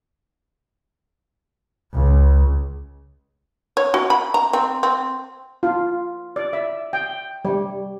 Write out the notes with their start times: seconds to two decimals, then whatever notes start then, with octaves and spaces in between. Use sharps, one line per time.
1.94 C#2
3.77 C#5
3.94 F#4
4.10 B5
4.34 A#5
4.53 C4
4.83 C4
5.63 F4
6.36 D5
6.53 E5
6.93 G5
7.45 G3